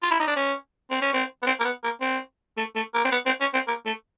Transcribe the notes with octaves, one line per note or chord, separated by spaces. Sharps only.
F4
E4
D#4
D4
C#4
C4
C#4
C4
B3
C4
A#3
B3
A#3
C4
A3
A3
A#3
C4
B3
C4
C#4
C4
A#3
A3